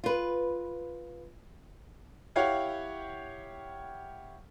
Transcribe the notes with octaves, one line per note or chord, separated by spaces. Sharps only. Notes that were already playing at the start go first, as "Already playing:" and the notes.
F4 B4
E4 G4 C#5 F5 F#5